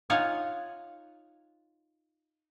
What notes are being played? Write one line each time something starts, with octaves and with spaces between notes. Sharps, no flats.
D#4 F4 C#5 F5 F#5 G#5